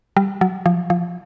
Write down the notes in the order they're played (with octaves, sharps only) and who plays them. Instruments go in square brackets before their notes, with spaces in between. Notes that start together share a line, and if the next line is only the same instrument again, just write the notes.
[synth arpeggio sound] G3
F#3
F3
F3